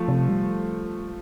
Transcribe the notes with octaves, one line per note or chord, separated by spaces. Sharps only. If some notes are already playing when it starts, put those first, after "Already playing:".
Already playing: F3 A3
C3
G3